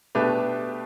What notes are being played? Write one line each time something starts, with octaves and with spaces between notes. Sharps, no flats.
B2 A3 D4 G4 B4